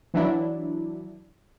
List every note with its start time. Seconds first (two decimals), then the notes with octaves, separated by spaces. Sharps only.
0.14 E3 F#3 D4 E4